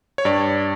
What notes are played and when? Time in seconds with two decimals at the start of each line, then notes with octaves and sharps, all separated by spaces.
0.18 C#5
0.25 G2 D5